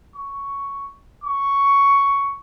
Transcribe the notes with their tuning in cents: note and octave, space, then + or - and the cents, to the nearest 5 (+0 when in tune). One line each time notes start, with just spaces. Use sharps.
C#6 +5
C#6 +5